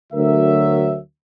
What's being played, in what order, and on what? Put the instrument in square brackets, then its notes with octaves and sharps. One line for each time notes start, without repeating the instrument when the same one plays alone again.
[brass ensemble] D2 F#3 A#4 E5